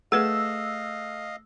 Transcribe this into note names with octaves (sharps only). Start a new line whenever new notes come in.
A3 G#4 B4 D#5 F5 F#5 E6